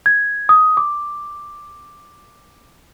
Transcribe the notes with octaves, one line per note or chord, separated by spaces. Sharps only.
G#6
D#6
D6